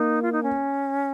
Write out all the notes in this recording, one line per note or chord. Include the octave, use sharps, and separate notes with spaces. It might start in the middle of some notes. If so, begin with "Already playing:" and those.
Already playing: A#3 D#4
F4
D#4
C#4